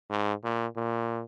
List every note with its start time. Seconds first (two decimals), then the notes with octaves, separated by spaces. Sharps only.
0.10 G#2
0.43 A#2
0.76 A#2